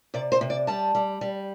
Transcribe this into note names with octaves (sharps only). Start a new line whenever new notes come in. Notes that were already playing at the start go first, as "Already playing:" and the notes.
C3 D5
C5
C3
D5
G3 A5
G3
G3